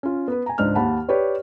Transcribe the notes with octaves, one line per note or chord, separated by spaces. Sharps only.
C#4 F4
B3 B4
G#5 A#5
C#2 G#2 D4 D#4 F6
D#2 F#5 A5 B5
G4 B4 C#5 D5